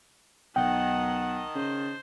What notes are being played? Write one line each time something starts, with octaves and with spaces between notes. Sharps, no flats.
B1 D#3 D#5 F#5 G5 A5
C#3 C5